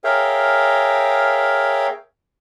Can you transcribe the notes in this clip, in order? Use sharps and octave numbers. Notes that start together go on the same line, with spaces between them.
G#4 A#4 C#5 E5 F5 G5